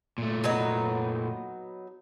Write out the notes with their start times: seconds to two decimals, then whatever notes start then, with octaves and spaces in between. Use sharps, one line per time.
0.18 A#2 A3
0.44 F#3 B3 D#4